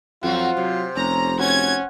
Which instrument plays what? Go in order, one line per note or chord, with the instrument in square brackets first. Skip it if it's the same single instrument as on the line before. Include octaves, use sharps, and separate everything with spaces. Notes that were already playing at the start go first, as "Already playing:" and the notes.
[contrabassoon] F2 [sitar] F#3 C4 F#4 [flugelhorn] F4
[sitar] C3 [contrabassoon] F#3
[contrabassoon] F1 [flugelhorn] C#4 [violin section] A#5
[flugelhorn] C#4 [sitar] F#4 [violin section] G#6